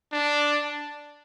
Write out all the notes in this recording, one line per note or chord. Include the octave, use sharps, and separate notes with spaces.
D4